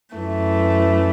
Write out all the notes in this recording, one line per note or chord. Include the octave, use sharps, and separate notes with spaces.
F#2 E3 A3